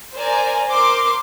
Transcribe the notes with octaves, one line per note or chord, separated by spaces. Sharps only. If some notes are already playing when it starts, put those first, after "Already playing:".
A#4 C5 D5 G#5 A#5
A#4 C5 C6 D6